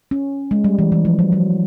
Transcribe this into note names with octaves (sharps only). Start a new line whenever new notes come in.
C#4
G#3
G3
E3
E3
F3
F#3
F#3